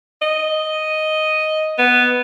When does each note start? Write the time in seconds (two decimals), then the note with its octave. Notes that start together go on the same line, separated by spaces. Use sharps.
0.22 D#5
1.78 B3